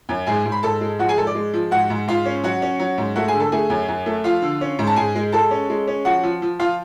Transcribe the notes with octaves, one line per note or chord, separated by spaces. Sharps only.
F#2
G#2 G#4 G#5
G#2
B5
G#2 A4 A5
G#3
F3 F#4 F#5
G#4 G#5
G#2 A4 A5
D5
G#3
F3
G#2 F#4 F#5
G#2
G#2 F4 F5
C#4
F#3 F#4 F#5
C#4
F#3
G#2
A3 F#4 F#5
G#4 G#5
D3
A4 A5
A3 G#4 G#5
F#2
F#2
A3
F3 F4 F5
D3
C#4
G#2
A5
G#2 G#4 G#5
G#3
G#3 A4 A5
C#4
G#3
C#4
F3 F#4 F#5
F3
F3
F3 F4 F5